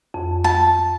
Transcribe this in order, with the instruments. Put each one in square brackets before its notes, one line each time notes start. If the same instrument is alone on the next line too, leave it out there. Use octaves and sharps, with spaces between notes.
[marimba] F2
[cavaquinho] A5